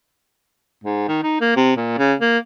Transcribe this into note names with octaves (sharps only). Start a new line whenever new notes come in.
G#2
D#3
D#4
A#3
C3
A#2
C#3
A#3